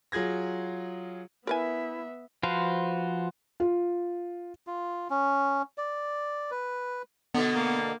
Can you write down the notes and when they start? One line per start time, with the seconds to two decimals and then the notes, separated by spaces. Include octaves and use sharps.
0.12 F#3 F4 G#4 G#6 A#6
1.47 B3 E4 A#4 B4 E5 G#5
2.43 F3 F#4 B4 C5 F5
3.60 F4
4.67 F4
5.10 C#4
5.78 D5
6.51 B4
7.35 B2 D3 B3
7.55 A#3